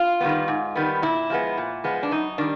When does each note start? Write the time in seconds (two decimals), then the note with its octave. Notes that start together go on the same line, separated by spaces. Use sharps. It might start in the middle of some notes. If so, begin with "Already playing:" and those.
Already playing: F4
0.20 D#3 G3 B3
0.48 G#2
0.75 D#3 G3 B3
1.02 A#2 E4
1.30 F3 G#3 B3
1.57 A#2
1.84 F3 G#3 B3
2.03 D4
2.11 F#2 D#4
2.38 D#3 G3 D4